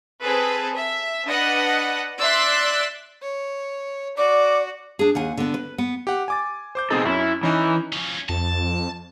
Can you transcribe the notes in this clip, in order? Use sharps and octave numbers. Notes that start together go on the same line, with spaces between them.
C4 G#4 A4 B4
E5
D4 B4 D#5 F#5
D5 E5 C6 E6 F#6
C#5
F#4 D5 D6
D4 G#4
D#2 F#5 G#5
D3 B3
B4
B3
G4 F#5
G#5 D6 A6
C5 D6 G6
B2 C4 D#4 G#4 A4
F#2 C#4 E4
E3 C#4 D#4
F3 C#4
F2 A5